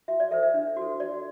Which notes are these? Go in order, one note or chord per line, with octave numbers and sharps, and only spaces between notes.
F#4 E5
D5
A4 C5 E5
E5
D4
F#4 A4
F#4 D5